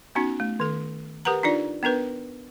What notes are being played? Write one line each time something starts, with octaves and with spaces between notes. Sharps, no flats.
B3 C#4 D#4 F#4
A3
D#3 A4
G4 A#4 B4 F#5 A#5
D4 D#4 F4 D5
B3 D4 A#4 B4